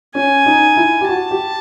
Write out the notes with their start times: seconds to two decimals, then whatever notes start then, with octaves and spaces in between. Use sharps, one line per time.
0.15 C#4 G#5
0.46 D#4
0.77 E4
1.01 G4
1.09 F#4 A5
1.31 G4